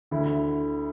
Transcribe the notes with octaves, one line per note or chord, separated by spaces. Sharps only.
D2 D3 E4